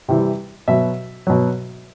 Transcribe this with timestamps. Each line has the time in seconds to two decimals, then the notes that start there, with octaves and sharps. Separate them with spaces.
0.09 C3 E3 G3
0.68 B2 F#3 E5
1.27 B2 F#3